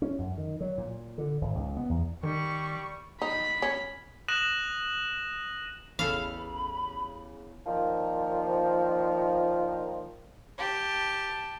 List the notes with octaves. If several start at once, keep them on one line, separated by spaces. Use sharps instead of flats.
C#4
F#2
D#3
F#3
A#2
D3
G#1
C#2
B3
E2
D#3 G3 C#6
D#4 B5
C#4
D#6 F#6 A#6 D#7 E7 F#7
A1 E2 C#3 A4 F5 B5
A#2 D#3 F3
G4 A5